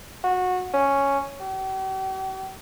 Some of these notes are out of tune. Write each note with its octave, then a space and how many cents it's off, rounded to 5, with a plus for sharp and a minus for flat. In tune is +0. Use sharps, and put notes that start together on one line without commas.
F#4 -20
C#4 +0
G4 -45